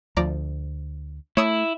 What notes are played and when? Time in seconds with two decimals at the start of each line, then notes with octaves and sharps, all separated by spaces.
0.17 D2 F3 D5 A#5
1.37 A3 E4 C#5 D#6 E6